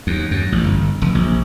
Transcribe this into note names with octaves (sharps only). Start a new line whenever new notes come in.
D#2
F#2
A1
G1
F1
A#1